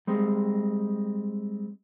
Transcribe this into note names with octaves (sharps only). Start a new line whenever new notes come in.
G3 G#3 C4